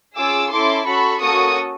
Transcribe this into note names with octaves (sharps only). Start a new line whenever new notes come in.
C#4 F4 G#4 D6 E6
C#4 E4 A4 C6 D6
C#4 F#4 A4 B5 C#6
A#3 C#4 F#4 A4 C#6 D#6